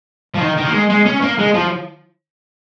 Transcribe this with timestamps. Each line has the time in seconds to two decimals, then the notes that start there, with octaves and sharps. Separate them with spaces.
0.34 F3
0.40 D#3
0.57 D#3
0.65 A#3
0.73 G#3
0.90 G#3
1.06 C#4
1.22 A#3
1.38 G#3
1.54 F3